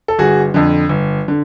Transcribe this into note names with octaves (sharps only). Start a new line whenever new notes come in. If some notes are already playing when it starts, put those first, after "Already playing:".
A4
G1 F#4 G#4
F2 D3
G1
D3